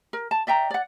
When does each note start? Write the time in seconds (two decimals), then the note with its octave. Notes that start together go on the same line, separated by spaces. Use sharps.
0.13 A#4
0.31 A5
0.47 D5 E5 G5 A#5
0.70 D5 F#5